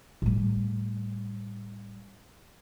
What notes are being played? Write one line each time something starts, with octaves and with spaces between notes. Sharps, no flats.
A2 G3